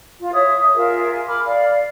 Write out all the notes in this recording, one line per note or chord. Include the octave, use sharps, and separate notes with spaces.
F4
C#5 E5 D#6
F4 G#4 A#4 E5
G#5
B5 D6 F6
D5 F5